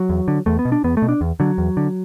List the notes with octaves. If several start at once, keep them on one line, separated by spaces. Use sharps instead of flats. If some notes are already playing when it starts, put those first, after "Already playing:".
Already playing: F#3
E2
D3
E2 A3
B3
B2
D4
E2 B3
A3
B2
D4
E2
D3 F#3
E2
D3